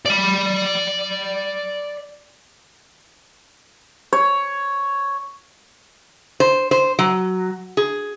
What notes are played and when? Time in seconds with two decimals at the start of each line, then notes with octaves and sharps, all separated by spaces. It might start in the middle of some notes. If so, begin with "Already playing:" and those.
0.06 D5 B5
4.13 C#5
6.40 C5
6.71 C5
6.99 F#3
7.77 G#4